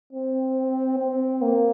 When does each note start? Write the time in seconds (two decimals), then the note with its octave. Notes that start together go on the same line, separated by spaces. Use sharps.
0.13 C4
0.99 C4
1.42 A#3